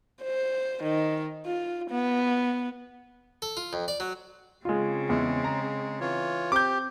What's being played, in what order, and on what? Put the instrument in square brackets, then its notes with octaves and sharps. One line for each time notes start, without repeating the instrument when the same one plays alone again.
[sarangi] C5
D#3
F4
B3
[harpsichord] A4
F4
F2
D5
F#3
[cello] C#3 C4 [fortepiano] G#3 F4
[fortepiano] E2 [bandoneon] G#3
[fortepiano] A#5
[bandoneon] E3 F4 C#5
[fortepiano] C4 [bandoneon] G4 [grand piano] D6 G6